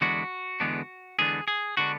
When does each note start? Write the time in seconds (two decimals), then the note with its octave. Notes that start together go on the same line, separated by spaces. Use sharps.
0.01 E2 D3 G#3 B3 D4 F#4
0.60 E2 D3 G#3 B3 D4
1.19 E2 D3 G#3 B3 D4 G#4
1.48 G#4
1.77 D3 G#3 B3 D4 F#4